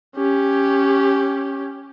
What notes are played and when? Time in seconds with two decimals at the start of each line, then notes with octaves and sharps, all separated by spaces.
0.16 C#4 G4